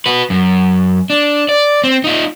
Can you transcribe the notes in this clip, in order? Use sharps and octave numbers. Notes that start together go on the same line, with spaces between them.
F#4 B4
F#2
D4
D5
C4
D#4 F4